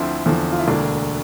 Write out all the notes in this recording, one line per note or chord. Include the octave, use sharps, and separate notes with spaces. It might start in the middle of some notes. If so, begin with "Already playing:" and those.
Already playing: D2 D3 F3 C4 E4
E2 D3 F3
F4
E4
E1 D2 D3 A#3 D4